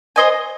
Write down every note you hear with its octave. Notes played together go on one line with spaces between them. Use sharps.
C5 D#5 G#5